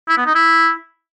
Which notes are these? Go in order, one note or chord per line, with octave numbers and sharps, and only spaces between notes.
E4
B3
D#4
E4